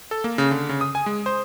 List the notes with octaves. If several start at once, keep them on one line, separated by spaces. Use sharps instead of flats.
A4
A#3
C#3
D3
C#3
D#6
G#5
G#3
C5